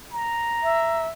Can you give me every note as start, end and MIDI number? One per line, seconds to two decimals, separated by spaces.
0.12 1.06 82
0.63 1.08 76